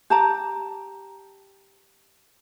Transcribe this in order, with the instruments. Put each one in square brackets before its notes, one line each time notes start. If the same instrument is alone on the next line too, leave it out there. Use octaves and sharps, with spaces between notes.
[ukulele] G4 A5 A#5